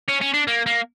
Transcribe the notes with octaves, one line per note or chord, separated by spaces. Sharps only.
C#4
C#4
D4
A#3
A#3